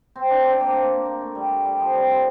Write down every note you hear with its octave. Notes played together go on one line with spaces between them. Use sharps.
C4
D4
C4
A#3
A#3
A#3
A3
G3
G3
F3
G3
F4